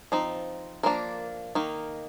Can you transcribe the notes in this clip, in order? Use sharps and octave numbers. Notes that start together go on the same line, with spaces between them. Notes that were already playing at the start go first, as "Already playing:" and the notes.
F3 C4 D#4
F3 A#3 D4 A#4
D#3 A#3 D#4